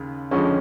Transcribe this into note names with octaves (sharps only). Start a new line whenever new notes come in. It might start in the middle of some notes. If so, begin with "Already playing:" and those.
Already playing: D#2 C#3
F2 D3 F3 G#3 C#4